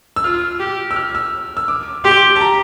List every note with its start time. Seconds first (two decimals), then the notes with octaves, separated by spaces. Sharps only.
0.16 E6
0.24 F4 F6
0.60 G4
0.91 E6
0.96 F6
1.15 E6
1.57 E6
1.68 D6
2.05 G4 C6
2.36 A5
2.41 A#5